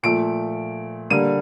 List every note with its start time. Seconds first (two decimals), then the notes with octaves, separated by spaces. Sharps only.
0.03 A#2 F3 A3 D7
1.10 D3 G3 A#3 D#7